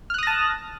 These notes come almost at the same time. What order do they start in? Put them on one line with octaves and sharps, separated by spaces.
F6 F#6 D#6 A#6 A5